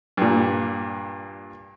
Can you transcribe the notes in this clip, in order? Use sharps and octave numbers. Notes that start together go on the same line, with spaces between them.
G2 A#2